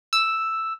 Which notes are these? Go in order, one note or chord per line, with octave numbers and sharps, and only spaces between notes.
E6